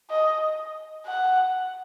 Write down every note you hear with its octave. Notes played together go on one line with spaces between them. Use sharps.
D#5
F#5